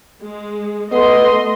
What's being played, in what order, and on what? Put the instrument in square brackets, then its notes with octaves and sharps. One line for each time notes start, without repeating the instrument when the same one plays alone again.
[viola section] G#3
[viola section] A3 D#5 C6 [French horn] B3